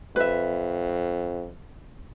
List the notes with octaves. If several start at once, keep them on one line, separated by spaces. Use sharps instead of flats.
F2 B4 E5